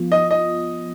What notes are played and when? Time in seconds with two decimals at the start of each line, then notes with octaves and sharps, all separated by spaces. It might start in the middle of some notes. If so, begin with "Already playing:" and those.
Already playing: F3 B3 F4
0.12 D#5
0.31 D#5